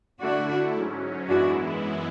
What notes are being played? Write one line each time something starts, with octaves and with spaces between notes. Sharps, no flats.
D3 A3 D4 E4 F#4
G#2 F#3 C#4
F#2 E3 G#3 B3 D4 E4 F#4